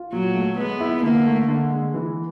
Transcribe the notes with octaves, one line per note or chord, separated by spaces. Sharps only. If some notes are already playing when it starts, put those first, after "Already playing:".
Already playing: F4
A#2 F#3
A3
G#3 B3
E4
D3 A#3
A3
D3
G#3
E3